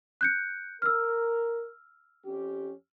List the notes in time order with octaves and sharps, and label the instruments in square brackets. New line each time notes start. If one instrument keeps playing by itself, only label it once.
[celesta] F#6 G6 C#7
[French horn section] A#4 [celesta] E6 F6
[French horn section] F2 C#4 G4